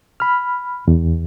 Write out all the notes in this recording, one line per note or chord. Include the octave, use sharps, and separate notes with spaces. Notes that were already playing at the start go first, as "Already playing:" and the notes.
B5 F6
E2